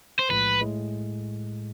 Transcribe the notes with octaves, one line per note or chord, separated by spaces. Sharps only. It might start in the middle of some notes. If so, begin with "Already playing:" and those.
C5
B1 A2 F3 G#3 B4
A2 G#3